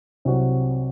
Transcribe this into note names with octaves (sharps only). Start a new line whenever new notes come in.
C2 C3 F#3 C4 F#4